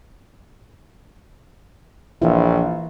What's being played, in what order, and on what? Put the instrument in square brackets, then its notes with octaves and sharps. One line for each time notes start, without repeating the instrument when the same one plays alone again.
[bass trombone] A#1 [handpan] E3 E4